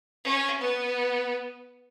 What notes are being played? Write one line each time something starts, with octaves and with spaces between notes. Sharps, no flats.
C#4
B3